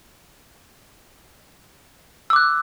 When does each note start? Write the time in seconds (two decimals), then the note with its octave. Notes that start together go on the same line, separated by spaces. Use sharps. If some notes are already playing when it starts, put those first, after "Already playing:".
2.30 E6
2.33 D6
2.36 F#6